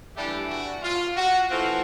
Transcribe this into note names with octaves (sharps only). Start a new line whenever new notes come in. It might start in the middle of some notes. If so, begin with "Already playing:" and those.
E3 G3 A3 D4 G4
F#4
F4
F#4
E3 A3 C4 F4 F#4